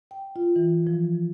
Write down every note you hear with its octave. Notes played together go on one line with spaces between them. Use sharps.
G5
F4
E3
F3